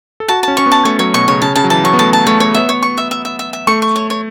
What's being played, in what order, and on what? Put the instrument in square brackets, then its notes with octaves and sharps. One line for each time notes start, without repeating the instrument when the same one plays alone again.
[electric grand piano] A4
[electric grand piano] F#4 [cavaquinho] A5
[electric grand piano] C#4 [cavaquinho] A5
[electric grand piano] C#4 [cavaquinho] C#6
[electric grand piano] B3
[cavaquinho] A5
[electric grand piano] A3 [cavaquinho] C#5
[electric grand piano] F#3 [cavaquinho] C#5
[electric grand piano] B2 [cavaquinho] C#6
[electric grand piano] C#3 [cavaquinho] C#5
[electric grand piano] C#3 [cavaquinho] A5
[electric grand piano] C#3 [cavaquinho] A5
[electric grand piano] F#3
[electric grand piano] E3 [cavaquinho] A5
[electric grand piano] F#3 [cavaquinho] C#6
[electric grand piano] B3
[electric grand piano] A3 [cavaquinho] A5
[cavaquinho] A5
[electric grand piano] A3 [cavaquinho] C#5
[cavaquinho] C#5
[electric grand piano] B3 [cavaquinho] E5
[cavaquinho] C#5
C#6
E5
E5
E5
E5
E5
[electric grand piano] A3 [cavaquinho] C#6
[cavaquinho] C#6
C#5
C#5